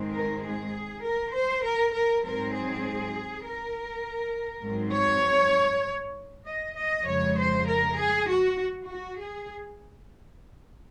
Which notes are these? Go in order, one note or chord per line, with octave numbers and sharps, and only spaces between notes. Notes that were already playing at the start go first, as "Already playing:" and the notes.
Already playing: G#2 D#3 G#3 C4
A#4
G#4
A#4
C5
A#4
A#4
G#2 F#3 C4 A#4
G#4
A#4
G#2 F#3 C4
C#5
D#5
D#5
F2 C#3 G#3 C#5
C5
A#4
G#4
F#4
F#4
G#4